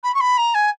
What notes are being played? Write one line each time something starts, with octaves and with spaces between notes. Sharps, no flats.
B5
C#6
B5
A#5
G#5